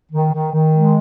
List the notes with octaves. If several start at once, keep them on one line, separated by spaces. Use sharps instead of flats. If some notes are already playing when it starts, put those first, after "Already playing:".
D#3
D#3
D#3
G#3